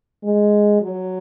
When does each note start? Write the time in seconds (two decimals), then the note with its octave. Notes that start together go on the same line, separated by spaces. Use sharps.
0.23 G#3
0.81 F#3